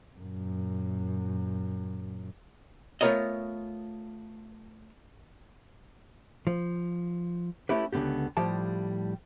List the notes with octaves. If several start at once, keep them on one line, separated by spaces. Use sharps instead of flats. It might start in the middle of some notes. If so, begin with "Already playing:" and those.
F#2 A#2
A3 B3 F4 A#4 C#5 D#5
F3
A3 C#4 E4 G4 B4
C#2 G#2 D3 B3 G4
A2 F3 G3 G4 A5